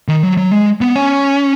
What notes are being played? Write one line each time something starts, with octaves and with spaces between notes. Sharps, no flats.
D#3
F#3
F#3
G#3
B3
C#4